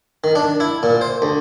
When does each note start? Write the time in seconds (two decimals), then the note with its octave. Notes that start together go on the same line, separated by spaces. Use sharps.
0.24 D#3
0.35 D4
0.60 E4
0.83 A#2
1.01 C5
1.22 D2